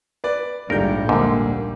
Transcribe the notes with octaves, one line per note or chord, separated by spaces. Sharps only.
B4 D5
D#1 A#1 G#2 D3 G3 A#4 G6
D2 G#2 D3 A#3